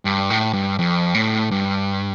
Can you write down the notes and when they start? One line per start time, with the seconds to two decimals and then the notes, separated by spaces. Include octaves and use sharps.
0.05 G2
0.30 A2
0.53 G2
0.79 F2
1.14 A2
1.51 G2